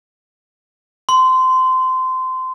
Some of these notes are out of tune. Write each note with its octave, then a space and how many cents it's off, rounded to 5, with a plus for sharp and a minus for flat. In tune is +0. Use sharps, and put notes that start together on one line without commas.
C6 -20